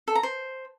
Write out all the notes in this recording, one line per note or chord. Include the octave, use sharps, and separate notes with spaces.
A4
A#5
C5